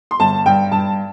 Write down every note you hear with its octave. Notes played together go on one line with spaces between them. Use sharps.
C6
G1 A5
G2 G5
G2 A5